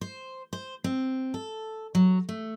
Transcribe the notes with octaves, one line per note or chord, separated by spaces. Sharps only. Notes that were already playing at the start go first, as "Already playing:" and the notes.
C5
C5
C4
A4
F#3
A3